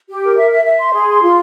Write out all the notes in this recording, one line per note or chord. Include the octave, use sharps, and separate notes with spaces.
G4
A#4
E5
E5
E5
C6
G#4
C6
F4